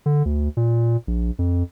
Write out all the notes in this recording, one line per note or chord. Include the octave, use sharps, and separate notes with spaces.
D3
D2
A#2
A#1
F2